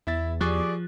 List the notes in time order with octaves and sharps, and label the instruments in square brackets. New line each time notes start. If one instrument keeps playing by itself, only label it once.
[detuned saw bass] E2 [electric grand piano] E4 E5 A6
[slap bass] F3 [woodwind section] G3 G4 D5 [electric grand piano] G#4 C#6 F#6